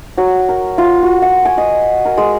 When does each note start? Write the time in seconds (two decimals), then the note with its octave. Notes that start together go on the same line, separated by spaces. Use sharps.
0.17 F#3
0.49 A#4
0.78 F4
1.03 F#4
1.22 F#5
1.45 G#5
1.58 D#5
2.05 A#4
2.17 G#3